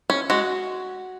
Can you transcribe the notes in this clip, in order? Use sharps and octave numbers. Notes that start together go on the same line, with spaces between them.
C#4
G#3 F#4